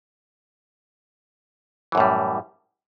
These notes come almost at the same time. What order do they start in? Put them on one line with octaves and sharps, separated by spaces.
E3 F#2 A2 G3